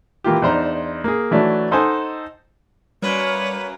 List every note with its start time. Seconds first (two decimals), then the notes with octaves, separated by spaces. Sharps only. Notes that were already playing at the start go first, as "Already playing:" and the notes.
0.24 E3 A#3 F4 G4
0.42 E2 D4 D#4 C5 A#5 C6
1.04 A#3 G#4
1.31 E3 F#3 A3 D4
1.71 D#4 A4 C5 D#5 F#5 G#5
3.02 F#2 F#3 G3 A#3 B4 C#5